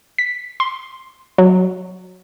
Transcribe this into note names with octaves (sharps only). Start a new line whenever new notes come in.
B6
C6
F#3